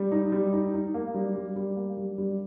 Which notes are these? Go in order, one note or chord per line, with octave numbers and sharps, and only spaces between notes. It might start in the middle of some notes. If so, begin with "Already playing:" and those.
Already playing: G3
D#4
G3
D#4
D#4
A#3
G3
G3
G3
A#3
G3
G3